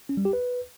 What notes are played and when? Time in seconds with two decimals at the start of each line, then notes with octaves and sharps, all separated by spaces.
0.09 C#4
0.17 G3
0.25 G4
0.33 B4